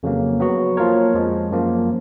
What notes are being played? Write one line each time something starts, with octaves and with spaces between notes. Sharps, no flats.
F2 C#3 F#3 A#3
F#3 B3 F#4
F3 A#3 F4 A#4 C#5
F2 F3 G#3
F#2 F3 A#3